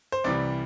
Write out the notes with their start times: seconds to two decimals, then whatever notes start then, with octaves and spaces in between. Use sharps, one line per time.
0.12 C5
0.24 C2 C3 E3 G3 D5